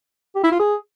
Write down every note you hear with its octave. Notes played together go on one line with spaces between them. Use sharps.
G4
E4
F4
G#4